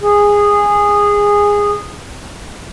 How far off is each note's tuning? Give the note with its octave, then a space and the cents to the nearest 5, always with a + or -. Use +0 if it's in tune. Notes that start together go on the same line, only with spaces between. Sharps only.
G#4 -15